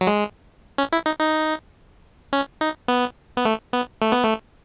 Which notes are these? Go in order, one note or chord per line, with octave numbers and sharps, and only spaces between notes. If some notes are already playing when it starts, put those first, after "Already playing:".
F#3
G#3
C#4
E4
D#4
D#4
C#4
D#4
B3
B3
A3
B3
A3
B3
A3